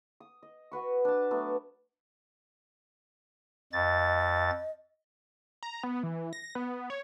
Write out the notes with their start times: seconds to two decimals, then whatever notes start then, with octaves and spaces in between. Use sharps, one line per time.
0.20 D#6
0.43 D#5
0.71 F#4 B4 C#6
1.05 D4 A5
1.31 F#3 A3 B3 D4
3.73 F2 D#5 A6
5.63 A#5
5.84 B3
6.03 E3
6.33 A#6
6.55 B3
6.90 C#5